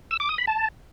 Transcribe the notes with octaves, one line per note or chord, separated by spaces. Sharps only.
E6
D6
D#6
B5
A5